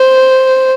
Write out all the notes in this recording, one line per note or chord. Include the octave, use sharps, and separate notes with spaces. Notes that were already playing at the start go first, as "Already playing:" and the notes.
Already playing: C5